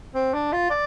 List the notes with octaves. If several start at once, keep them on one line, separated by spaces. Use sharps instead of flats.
C4
D4
F4
D5